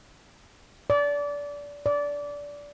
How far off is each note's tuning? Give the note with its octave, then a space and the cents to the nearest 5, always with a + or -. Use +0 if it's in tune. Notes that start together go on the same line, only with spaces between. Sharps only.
D5 -25
D5 -20